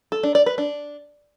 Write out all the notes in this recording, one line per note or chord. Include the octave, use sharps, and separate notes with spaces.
A4
D4
D5
B4
D4